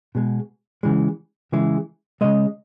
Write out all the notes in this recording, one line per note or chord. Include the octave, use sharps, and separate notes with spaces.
B2 G#3
C#3 E3 G#3
C#3 E3 G#3
C#3 E3 G#3 D#5